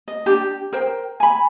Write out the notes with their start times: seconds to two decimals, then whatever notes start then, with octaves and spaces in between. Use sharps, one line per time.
0.08 D#5
0.26 D4 G4
0.73 A#4 C5 G5
1.20 G#5 B5